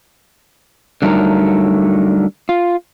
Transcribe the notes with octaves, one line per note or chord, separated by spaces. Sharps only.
D3 F#3 G3 A3 D#4 A#4
F4